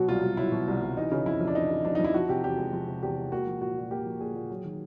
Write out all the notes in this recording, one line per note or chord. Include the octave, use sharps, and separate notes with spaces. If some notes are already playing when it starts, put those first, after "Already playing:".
Already playing: B2 F#3 F#4
C2 F4
C2
F#3 E4
B2
C2
C2
E3 D#4
C#3
F2 E4
F2
D4
E3 D#4
C#3
F2 D4
D#4
F2 E4
F3 F#4
C3 G4
E2 G4
G#3
F3
C3
E2 G4
G#3
A#3 F#4
F3
A#2 F#4
A#2
A#3 G4
F3
A#2 G#4
A#2
F#3
D#3